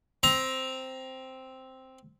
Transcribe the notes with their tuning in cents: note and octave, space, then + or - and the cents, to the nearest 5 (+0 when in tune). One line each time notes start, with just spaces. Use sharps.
C4 +0 A#5 +15